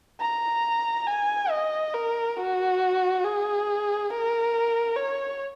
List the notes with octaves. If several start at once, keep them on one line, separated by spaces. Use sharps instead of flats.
A#5
G#5
D#5
A#4
F#4
G#4
A#4
C#5